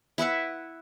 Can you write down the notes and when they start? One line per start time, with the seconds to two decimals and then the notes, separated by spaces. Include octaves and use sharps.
0.18 E4 B4 E5 F#5